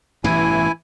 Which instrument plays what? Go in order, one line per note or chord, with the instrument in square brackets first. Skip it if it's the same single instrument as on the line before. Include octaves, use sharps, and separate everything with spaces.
[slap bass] A1 G2 B2 [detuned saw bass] E3 [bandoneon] E4 G#5